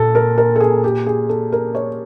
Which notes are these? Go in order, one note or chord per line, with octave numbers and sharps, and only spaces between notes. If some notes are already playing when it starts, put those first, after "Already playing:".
Already playing: A#2 A4
A#4
A#4
A4
G#4
G4
G#4
A4
A#4
C#5